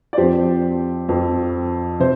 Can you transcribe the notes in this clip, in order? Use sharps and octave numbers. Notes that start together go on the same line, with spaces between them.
D5
F2 F3 C4 G4 C5
F2 F3 C4
C3 C5